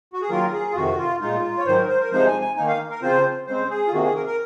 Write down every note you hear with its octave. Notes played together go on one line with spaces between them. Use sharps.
F#4
G#4
D#3 F#3 A#3 F4 A#4
G#4
F4
F2 C3 D#3 F#4
F4
A#2 G#3 D#4 F4
C#5
G#2 D#3 F#3 C5
A#4
C5
A#4
C3 F3 G#3 D#4 C5
G#5
G#5
D#3 A#3 D#4 G#5
F5
A#4
C#3 F3 C4 F4 C5
C#3 G#3 C4 C5
G#4
F4
C3 D#3 A#3 F#4
G#4
A#4
A#4